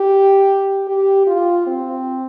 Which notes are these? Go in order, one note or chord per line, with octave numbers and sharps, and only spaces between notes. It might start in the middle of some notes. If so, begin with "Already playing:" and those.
Already playing: G4
G4
F4
C4